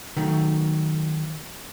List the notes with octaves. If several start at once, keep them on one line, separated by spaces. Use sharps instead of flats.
D#3 F#3 A3